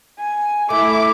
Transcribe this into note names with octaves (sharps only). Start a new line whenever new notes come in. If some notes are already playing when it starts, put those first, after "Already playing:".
G#5
A3 E4 D6